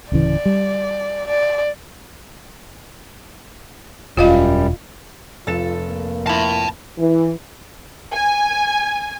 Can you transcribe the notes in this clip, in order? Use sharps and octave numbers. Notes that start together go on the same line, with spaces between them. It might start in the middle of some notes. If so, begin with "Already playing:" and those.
D1 C#3 E3 D5
G3
D5
E1 F#2 G3 F4 D#5 F5
F1 F4 A4 A6 E7
A#3
F3 E4 A5 B5
E3
G#5